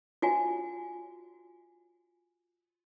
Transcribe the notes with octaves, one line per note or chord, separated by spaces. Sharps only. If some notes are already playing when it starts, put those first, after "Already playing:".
F4 F#4 G#5